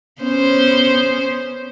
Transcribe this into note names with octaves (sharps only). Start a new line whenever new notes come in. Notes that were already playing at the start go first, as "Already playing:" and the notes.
B3 C#4 C5